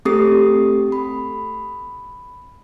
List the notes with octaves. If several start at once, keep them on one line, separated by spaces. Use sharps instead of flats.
A3 C4 G4 A4 D#6 C7
B5